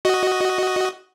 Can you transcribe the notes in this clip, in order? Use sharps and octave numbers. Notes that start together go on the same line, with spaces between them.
F#4 D#5